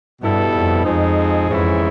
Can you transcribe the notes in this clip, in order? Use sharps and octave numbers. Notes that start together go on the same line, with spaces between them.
G2 B2 G3 B3 E4 A4
F2
F2 F3 G#3 C4 D#4 G#4
F2 G#2 E3 G#3 C#4 E4